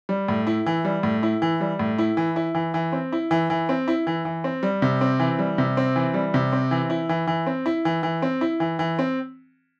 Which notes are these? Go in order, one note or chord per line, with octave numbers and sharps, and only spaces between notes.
G3
A2
E4
E3
G3
A2
E4
E3
G3
A2
E4
E3
E4
E3
E3
C4
E4
E3
E3
C4
E4
E3
E3
C4
G3
C3
C4
E3
G3
C3
C4
E3
G3
C3
C4
E3
E4
E3
E3
C4
E4
E3
E3
C4
E4
E3
E3
C4